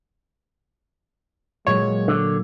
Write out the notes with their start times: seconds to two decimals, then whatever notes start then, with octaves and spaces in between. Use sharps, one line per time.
1.67 A#2 F#3 G#3 C#5
2.08 D3